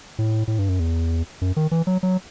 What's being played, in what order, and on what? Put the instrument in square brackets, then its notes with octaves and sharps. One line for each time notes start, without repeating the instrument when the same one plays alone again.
[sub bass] A2
A2
G2
F#2
E2
F#2
D#3
E3
F#3
F#3